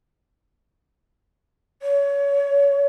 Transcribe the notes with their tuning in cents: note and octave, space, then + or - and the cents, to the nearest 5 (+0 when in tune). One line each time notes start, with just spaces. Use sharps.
C#5 +25